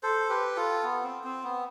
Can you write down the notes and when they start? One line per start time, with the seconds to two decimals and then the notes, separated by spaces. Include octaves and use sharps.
0.03 A4 C5
0.29 G4 B4
0.56 F4 A4
0.83 B3
1.03 C4
1.24 C4
1.43 B3